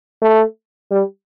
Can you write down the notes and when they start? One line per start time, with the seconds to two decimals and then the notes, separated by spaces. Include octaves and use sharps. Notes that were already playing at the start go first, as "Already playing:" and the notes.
0.22 A3
0.91 G3